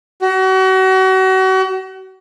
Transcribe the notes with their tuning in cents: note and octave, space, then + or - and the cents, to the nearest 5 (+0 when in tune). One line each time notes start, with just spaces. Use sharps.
F#4 +35